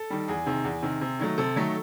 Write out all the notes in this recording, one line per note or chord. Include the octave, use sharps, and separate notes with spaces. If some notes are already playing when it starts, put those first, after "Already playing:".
Already playing: A4
D#3 G3
E2 G#4
C3 D#3
E2
C3 D#3
C3
D#3 F#3 A3
C3 A4
D#3 F#3 A3